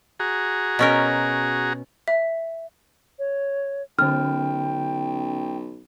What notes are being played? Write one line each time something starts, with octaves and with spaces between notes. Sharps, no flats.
F#4 G#4 A#5
B2 C#4 A#4
E5
C#5
B1 D3 C#4 G5 F6